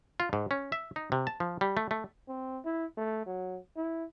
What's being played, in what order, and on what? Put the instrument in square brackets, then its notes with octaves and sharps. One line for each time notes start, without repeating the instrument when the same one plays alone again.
[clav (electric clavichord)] F4
G#2
C#4
E5
D#4
C3
A5
F3
G3
A3
A3
[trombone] C4
E4
A3
F#3
E4